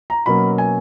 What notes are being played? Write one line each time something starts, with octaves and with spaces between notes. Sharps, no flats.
A#5
B2 F#3 A#3 C#4 B5
G#5